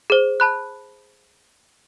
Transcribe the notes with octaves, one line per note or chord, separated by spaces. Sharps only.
G#4 C5
A5 B5 F#6